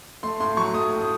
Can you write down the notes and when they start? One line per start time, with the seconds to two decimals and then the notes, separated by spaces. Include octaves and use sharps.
0.23 A3 C6
0.40 A2 C6
0.57 F#3 C#6
0.74 A3 D#6
0.92 A2
1.02 D#6